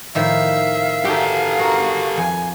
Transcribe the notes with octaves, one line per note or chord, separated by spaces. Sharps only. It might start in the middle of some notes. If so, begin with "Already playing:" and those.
A2 D#3 F3 E5 F5
D#4 F#4 G4 A4
F#4 A#4 G#5
F2 G#5